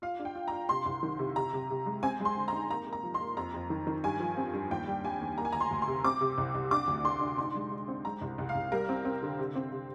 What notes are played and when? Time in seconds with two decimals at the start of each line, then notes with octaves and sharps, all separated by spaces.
0.02 F4 F5
0.19 D4
0.25 G5
0.35 F4
0.48 A#5
0.52 F4
0.69 C3 C6
0.86 C2
1.03 D#3
1.19 C3
1.36 C3 A#5
1.53 C3
1.70 C3
1.86 G#3
2.03 C4 G#5
2.20 G#3
2.25 C6
2.37 D3
2.48 A#5
2.53 D#4
2.71 A#3 A#5
2.87 A#3
2.93 A#5
3.03 F3
3.14 C6
3.21 A#3
3.37 F2 A#5
3.54 F2
3.70 D#3
3.87 D#3
4.04 G2 G#5
4.20 F3
4.37 C4
4.53 G2
4.70 D#2 G5
4.87 G3
5.04 G3 G#5
5.21 D#2
5.38 A#3 A#5
5.45 G#5
5.52 D2 A#5
5.60 C6
5.71 D2
5.82 C6
5.87 C3
6.04 C4 D6
6.21 C3
6.38 C2
6.55 C2
6.71 D4 D6
6.87 D2
7.04 D3 C6
7.21 D4
7.38 D#4 C6
7.55 G#3
7.71 G#3
7.88 C4
8.05 G#3 A#5
8.21 C2
8.38 C2
8.49 F5
8.55 C2
8.72 G3 A#4
8.89 C4
9.05 C4
9.23 D3
9.39 C3
9.55 C4
9.72 C3